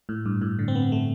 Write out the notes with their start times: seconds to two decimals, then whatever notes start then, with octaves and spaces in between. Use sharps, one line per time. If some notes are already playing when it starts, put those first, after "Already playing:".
0.09 A2
0.26 G2
0.42 A2
0.59 D3
0.68 C4
0.75 B3
0.92 A3